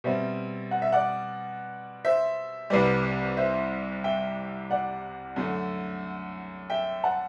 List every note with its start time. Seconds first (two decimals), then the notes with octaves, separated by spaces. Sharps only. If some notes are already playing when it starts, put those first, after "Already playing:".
0.04 B2 G3 C4 C5 E5
0.71 F#5
0.82 E5
0.92 D5 F#5
2.05 C5 E5
2.70 C2 C3 G3 B4 D5
3.37 C5 E5
4.04 E5 G5
4.70 D5 F#5
5.36 F#2 D3 A3
6.70 E5 G5
7.04 F#5 A5